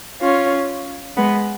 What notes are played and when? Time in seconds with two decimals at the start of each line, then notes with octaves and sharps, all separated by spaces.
0.21 C#4 F4
1.16 G#3 B3